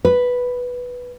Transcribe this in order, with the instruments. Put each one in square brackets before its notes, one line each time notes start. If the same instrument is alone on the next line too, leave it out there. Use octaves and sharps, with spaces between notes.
[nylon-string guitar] B4